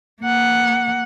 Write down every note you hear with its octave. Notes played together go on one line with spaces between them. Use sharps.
A#3 F#5